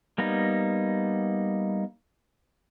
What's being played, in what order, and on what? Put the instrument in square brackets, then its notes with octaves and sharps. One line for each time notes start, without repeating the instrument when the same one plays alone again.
[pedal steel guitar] G3 A#3 B3 D#4